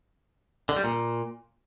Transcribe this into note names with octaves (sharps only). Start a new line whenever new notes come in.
D3
G3
A#2